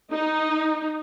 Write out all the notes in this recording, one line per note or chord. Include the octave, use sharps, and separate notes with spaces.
D#4